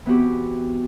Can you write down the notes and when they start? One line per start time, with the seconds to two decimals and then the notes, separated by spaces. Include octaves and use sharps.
0.06 E3 B3 C4 F#4 G4